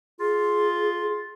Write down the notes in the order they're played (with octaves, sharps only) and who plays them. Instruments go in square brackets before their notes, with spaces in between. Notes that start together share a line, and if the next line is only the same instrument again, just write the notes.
[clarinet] F4 [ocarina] G#4